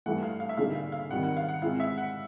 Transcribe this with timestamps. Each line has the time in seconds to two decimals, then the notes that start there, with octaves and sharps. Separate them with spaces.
0.06 G2 E3 A3 F#5
0.23 F5
0.40 F5
0.49 E5
0.57 D3 G3 A#3 D#4 G#4 F5
0.75 F5
0.92 F5
1.10 D#3 G3 C4 F#5
1.23 F#5
1.37 F5
1.49 F#5
1.62 G#3 C4 E4 F5
1.80 E5
1.98 F#5